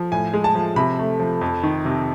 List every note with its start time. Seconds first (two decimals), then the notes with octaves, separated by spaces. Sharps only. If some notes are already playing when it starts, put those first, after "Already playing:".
Already playing: F3
0.12 A2 G#5
0.33 G#3
0.44 A5
0.55 F3
0.76 C3 B5
0.99 A3
1.19 F3
1.41 F2
1.63 D#3
1.85 C3